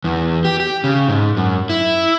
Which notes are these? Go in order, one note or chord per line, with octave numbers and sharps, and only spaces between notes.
E2
G4
G4
C#3
G#2
F#2
E4